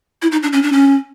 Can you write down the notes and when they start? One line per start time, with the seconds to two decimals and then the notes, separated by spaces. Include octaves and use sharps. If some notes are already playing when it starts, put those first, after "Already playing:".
0.22 E4
0.32 D#4
0.43 D4
0.53 C#4
0.62 D4
0.72 C#4